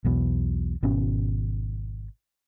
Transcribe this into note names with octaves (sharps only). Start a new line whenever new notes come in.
B1 E2 B2
G#1 B2 C#4